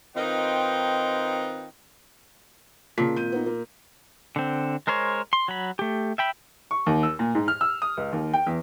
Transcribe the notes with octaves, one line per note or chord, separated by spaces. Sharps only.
D#3 C4 D#4 F4 B4 G5
A#2 C#3 A5 B6
G#1 G6 D#7
B3 D#4
A#3 F4
D3 C4
G#3 A#4 C5 C#5
C6
F#3 B5
A3 G4
E5 G5 B5
C#6
D#2
E6
A#2
G#2
F6
E6
D#6
C#2
D#2
G5
E2